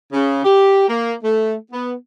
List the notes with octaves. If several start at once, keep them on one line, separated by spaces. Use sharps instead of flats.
C#3
G4
A#3
A3
B3